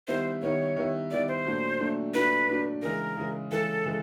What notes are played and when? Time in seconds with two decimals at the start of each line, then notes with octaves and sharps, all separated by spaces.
0.08 D#3 G3 B3 E4 C5
0.42 D#3 G3 B3 E4 C#5
0.77 D#3 G3 B3 E4
1.11 D#3 G3 B3 E4 D5
1.28 C5
1.45 A#2 F#3 A3 D4 F#4
1.79 A#2 F#3 A3 D4 F#4
2.13 A#2 F#3 A3 D4 F#4 B4
2.48 A#2 F#3 A3 D4 F#4
2.82 C#3 E3 G#3 A#4
3.17 C#3 E3 G#3
3.51 C#3 E3 G#3 A4
3.85 C#3 E3 G#3